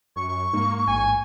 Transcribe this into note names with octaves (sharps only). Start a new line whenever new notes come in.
F#2 C#6
G#2 A#3
A1 G#5